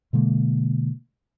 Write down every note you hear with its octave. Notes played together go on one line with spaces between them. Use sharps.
B2 D3 G#3 A#3